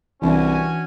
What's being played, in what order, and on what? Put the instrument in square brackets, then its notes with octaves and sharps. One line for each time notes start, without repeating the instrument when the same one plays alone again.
[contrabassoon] C2 [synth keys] E3 D4 [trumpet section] C#4 F#4 G#5